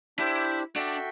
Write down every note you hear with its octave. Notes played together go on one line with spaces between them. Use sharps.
D4 E4 G4 C5
D4 F#4 A4 E5 G5